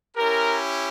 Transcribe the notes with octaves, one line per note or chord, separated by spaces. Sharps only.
C#4 E4 G4 A#4